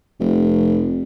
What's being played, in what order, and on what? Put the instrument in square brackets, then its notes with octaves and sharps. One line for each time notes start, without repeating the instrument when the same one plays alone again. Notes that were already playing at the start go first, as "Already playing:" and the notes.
[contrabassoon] F1